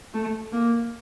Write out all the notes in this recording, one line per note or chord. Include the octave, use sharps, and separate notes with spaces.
A3
A#3